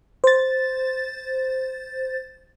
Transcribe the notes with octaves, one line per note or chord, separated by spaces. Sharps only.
C5 A6